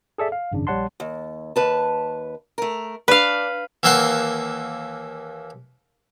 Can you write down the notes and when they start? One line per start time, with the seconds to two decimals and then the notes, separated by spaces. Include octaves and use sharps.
0.18 G#4 A4 D5 E5
0.32 F5
0.52 G#1 F#2 C#3 D4
0.67 A#1 G3 C#5 F#5 A5 C6
1.00 D#2
1.56 D#2 B4 A5
2.58 A3 A#4
3.08 D4 B4 F5
3.83 D#2 E3 A#3 E5 F#5 C6